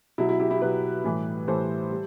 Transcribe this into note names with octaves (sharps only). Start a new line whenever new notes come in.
B2 F#3 E4
E4
E4 G4
E4 G4
B2 F#3 G4 B4
A2 E3 G3
A2 E3 G3 A4 C5
G3